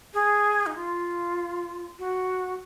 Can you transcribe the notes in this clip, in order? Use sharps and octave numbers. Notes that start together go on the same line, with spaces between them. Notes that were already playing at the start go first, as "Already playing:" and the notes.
G#4
D#4
F4
F#4